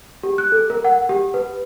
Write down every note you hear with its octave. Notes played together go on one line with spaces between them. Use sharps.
G4
F#6
A4
A#4
F#5
G4
B4